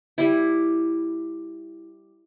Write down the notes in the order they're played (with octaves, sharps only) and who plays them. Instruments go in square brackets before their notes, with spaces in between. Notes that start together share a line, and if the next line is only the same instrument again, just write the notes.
[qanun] G3 E4